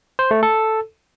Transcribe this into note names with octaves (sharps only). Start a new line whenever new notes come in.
C5
A3
A4